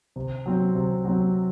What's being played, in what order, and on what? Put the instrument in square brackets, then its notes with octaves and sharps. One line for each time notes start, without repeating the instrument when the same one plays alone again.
[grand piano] C3
F#3 C4
C3
F#3 C4